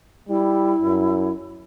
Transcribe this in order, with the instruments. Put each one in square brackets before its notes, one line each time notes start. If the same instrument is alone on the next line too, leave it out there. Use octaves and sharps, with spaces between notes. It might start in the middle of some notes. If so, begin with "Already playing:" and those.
[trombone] G3 [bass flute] E4
[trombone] F#2